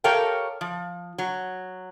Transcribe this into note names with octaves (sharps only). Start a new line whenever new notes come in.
G4 A4 A#4 C#5 F5 G5
F3
F#3